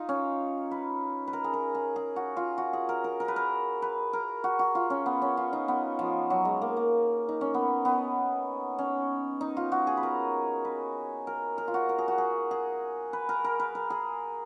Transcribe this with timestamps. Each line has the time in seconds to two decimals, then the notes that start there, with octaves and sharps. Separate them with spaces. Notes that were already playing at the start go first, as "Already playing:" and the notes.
Already playing: D#4 F4
0.09 C#4
0.71 B4
1.27 B4
1.33 A#4
1.44 G#4
1.53 A#4
1.75 G#4
1.96 G#4
2.16 F#4
2.37 F4
2.58 F#4
2.73 G#4
2.89 A#4
3.04 A#4
3.20 A#4
3.28 B4
3.36 A#4
3.82 B4
4.13 A#4
4.44 F#4
4.59 F#4
4.75 F4
4.90 C#4
5.06 B3
5.22 C#4
5.37 F4
5.53 D#4
5.68 B3
5.99 F3
6.30 F#3
6.45 G#3
6.62 A#3
6.77 A#3
7.29 D#4
7.41 C#4
7.54 B3
7.85 B3
8.79 C#4
9.41 D#4
9.57 F4
9.72 F#4
9.87 G#4
9.97 B4
10.03 A#4
10.65 B4
11.27 A#4
11.58 A#4
11.68 F4
11.74 F#4
11.89 A#4
11.98 G#4
12.08 F#4
12.18 G#4
12.51 G#4
13.13 B4
13.29 A#4
13.45 A#4
13.60 B4
13.75 A#4
13.90 G#4